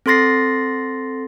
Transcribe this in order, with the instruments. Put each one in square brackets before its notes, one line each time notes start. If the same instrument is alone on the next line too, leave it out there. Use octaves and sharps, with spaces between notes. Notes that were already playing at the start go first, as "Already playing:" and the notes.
[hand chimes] C4 A4 C6 A6 A#6 C7